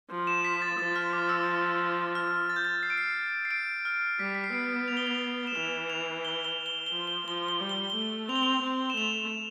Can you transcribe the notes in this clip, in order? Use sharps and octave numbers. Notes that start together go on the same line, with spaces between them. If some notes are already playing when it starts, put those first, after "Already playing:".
F3
E7
B6
A6
F3 A6
F6
D6
E6
F6
A6
G6
A6
C7
D7
C7
C7
D7
F6
G3 B6
B6
C7
B3 D7
F7
G7
F7
E7
E3 F7
F7
G7
G7
G7
G7
F3
G7
F3 G7
G7
G3
G7
G7
A3
C4 F7
G7
F7
C4
E7
A3 F7